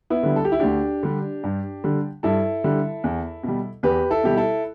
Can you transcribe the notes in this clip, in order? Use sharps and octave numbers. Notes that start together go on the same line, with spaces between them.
B3 E4
D3 G3
A4
G4
E4
D2 D4 G4
D3 G3
G2
D3 G3
G2 E4 A4
D3 G3
E2
B2
G3
E2 G4 B4
E4 A4
B2 G3 G4
E4 A4